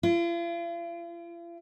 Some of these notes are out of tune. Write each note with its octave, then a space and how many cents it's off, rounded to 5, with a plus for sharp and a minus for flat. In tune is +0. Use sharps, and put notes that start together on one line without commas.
F4 -45